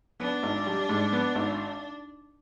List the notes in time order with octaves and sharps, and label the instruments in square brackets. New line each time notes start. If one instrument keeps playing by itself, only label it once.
[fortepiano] B3 [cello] D4
[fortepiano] G#1
G3
G#2
B3
G#1